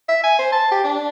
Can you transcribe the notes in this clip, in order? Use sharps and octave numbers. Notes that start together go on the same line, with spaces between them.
E5
G#5
C5
A5
G4
D4